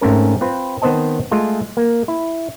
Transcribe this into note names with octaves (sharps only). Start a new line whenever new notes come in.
G#2 A3 C4 C#4 A#4
C4 F4 B4
D#3 B3 C4 C5 D#5 A5
G#3 A3 F4
A#3
E4